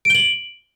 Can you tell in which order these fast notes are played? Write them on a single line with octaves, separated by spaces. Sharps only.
D7 G7 F#7